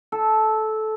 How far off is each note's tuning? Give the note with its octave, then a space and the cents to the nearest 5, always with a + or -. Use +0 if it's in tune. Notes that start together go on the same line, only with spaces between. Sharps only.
A4 -15